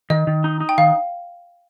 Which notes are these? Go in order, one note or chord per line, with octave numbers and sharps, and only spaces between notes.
D#3 D#5
D#3
D#4
D#4
G5
D#3 F5